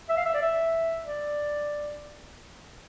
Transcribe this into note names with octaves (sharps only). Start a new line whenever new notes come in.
E5
F5
E5
D5
E5
D5